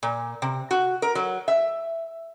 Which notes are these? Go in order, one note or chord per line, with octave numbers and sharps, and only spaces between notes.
A#2
C3
F#4
A#4
F#3
E5